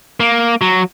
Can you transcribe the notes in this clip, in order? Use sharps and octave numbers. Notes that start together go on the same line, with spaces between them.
A#3
F#3